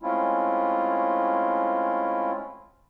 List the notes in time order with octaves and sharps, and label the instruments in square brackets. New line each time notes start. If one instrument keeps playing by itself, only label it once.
[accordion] G#3 A3 C4 C#4 E4 F4